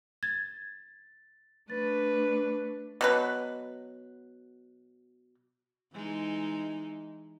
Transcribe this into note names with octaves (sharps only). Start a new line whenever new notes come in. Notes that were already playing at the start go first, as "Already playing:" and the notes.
G#6 A6
A3 D4 B4 A6
B2 F#3 B4
E3 G#3 D#4